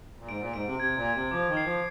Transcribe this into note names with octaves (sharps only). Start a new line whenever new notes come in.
A#2
G#2 D7
A#2
G#2 D7
C3
C3 G#6
A#2
G#6
C3
F3 D6
D#3
C7
F3